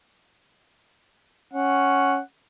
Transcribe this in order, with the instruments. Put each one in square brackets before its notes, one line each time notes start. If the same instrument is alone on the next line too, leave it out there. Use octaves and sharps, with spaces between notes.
[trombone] C#4 [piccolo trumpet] F#5